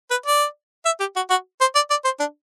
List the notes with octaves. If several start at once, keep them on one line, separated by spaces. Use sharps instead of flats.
B4
D5
E5
G4
F#4
F#4
C5
D5
D5
C5
D4